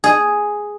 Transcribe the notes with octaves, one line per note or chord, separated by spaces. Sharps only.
G#4